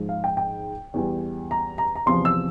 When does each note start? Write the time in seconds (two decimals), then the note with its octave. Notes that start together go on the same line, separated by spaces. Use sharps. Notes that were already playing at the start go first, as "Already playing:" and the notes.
Already playing: G#2 F3 G#3
0.09 F5
0.24 G5
0.37 G5
0.94 E2 E3 G3
1.51 A#5
1.78 A#5
1.96 A#5
2.06 E2 C3 F3 C6
2.25 E6